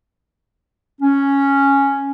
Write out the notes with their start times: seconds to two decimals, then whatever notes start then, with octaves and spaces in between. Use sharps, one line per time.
1.01 C#4